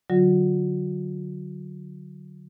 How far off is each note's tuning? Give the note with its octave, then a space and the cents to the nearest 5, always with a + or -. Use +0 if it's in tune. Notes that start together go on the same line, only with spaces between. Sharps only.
D3 +0 F#3 +0 F#4 -45